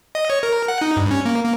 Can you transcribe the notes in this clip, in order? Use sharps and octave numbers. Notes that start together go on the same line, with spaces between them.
D#5
C#5
A#4
F#5
D#4
G2
C#4
A#3
A#3